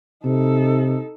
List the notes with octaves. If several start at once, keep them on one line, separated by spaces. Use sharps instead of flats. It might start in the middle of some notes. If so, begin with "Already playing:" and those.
C3 D#4 A4